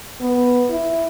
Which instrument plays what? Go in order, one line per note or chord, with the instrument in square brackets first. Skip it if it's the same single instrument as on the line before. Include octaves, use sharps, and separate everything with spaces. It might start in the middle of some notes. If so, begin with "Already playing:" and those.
[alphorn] B3
E4